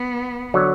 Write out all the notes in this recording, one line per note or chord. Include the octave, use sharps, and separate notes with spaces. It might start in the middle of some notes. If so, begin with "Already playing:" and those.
Already playing: B3
D3 F#3